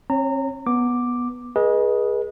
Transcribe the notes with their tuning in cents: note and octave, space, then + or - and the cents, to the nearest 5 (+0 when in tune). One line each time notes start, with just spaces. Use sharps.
C4 +45 C#5 -5 A#5 -30
B3 -10 D6 +5
G#4 +0 B4 -35 D#5 +5